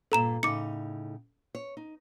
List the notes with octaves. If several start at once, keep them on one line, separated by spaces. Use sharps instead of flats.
G2 A#2 A4 A#5 E7
A2 C#3 D#4 D6 C#7
C#5
D#4